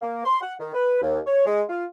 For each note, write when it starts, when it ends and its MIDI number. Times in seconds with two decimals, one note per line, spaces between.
0.02 0.25 58
0.25 0.40 84
0.41 0.54 78
0.60 0.72 51
0.74 0.98 71
1.02 1.19 39
1.26 1.44 73
1.46 1.62 56
1.69 1.84 65